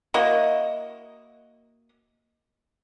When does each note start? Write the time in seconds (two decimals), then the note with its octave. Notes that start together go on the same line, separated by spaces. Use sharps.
0.14 A#3 E4 F#4 D#5